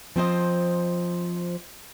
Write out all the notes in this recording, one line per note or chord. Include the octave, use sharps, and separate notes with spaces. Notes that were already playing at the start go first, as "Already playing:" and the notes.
F3 C4 C5 D#5